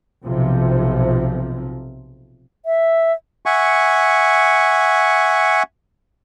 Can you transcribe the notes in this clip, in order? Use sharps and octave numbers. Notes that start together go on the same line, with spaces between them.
B1 C3 F3
E5
E5 F#5 G#5 C#6